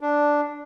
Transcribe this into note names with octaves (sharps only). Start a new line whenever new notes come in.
D4